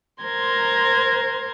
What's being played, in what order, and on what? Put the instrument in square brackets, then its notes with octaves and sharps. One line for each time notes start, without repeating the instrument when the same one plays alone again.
[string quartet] A#4 C5 A#5 C6 G#6